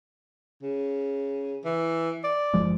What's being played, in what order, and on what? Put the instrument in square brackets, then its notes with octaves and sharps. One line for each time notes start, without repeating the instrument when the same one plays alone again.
[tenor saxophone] C#3
E3
D5
[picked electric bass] G1 F3 G#3